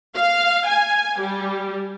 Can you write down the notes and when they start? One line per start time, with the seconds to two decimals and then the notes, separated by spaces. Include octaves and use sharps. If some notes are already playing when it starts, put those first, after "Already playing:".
0.17 F5
0.67 G#5
1.21 G3